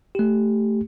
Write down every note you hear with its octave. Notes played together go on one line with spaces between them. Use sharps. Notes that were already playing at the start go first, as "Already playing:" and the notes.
A3 G4